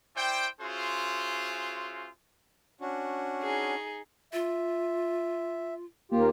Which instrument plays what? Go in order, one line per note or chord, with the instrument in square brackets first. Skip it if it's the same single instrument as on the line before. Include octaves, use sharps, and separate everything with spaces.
[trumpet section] E4 C5 D5 G5
C#4 F4 F#4 G#4 C5 E5
[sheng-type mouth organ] C#4 D4 F#4
[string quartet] D#4 G#4
[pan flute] F4 [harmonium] E5
[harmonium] D#2 F4 G4 [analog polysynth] A#3